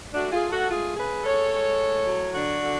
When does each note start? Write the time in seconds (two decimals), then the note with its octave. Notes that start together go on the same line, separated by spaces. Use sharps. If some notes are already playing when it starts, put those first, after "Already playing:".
0.13 A3 D4 F#4
0.31 F4 G#4
0.40 A3
0.50 F#4 A4
0.68 G#3 F4 G#4
0.96 C#3 G#4 B4
1.24 G#3 A4 C#5
1.52 G#3
1.79 A2
2.07 F#3
2.35 D3 D4 F#4
2.63 D3